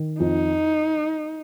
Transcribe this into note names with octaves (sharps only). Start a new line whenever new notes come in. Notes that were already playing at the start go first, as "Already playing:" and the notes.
Already playing: D#3
F2 D#4